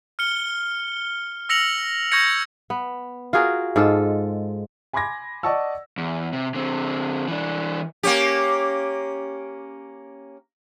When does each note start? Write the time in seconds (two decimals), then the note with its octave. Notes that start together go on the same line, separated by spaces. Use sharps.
0.19 F6 C#7 G7
1.49 E6 A#6 C#7 F7 F#7
2.12 C#6 G6 G#6 A#6 C#7
2.70 B3
3.33 F4 F#4 G#4 A#4
3.76 G#2 G#3 F4 A4
4.93 G#5 B5 C6 D6 G#6 A#6
5.43 D5 D#5 F#5 A5 C#6 E6
5.98 E2
6.33 C3
6.55 D3 C4
7.28 E3 D4
8.03 A#3 C#4 G4